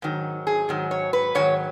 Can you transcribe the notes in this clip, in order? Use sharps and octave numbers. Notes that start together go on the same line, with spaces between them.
G#2 D#3 F#3
G#4
G#2 D#3 F#3
C#5
B4
G#2 D#3 F#3 C#5